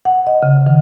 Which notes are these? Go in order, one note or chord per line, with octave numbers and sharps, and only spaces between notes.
F#5
D#5
C#3
D#3